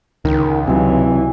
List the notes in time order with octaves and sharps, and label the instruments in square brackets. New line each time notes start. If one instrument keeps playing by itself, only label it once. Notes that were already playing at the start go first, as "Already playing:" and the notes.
[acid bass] C#2 [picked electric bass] D#3
[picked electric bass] C3 F#3 [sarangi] E3